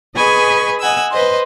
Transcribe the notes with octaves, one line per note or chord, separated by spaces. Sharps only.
G#4 B4 D#5 G#5 B5 C#6
D#5 F#5 G#5 E6
B4 C5 D#5 C6